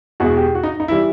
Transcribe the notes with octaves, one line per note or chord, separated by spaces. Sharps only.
E2 B2 G#3 F#4
G4
F#4
D#4
D#4
E3 G3 E4